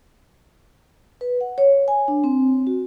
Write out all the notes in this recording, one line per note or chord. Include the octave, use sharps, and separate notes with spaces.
B4
F#5
C#5
G#5
D4
C4
F#4